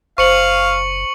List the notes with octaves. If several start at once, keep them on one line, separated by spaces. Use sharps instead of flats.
F#1 C5 F5 C#6 C#7 F#7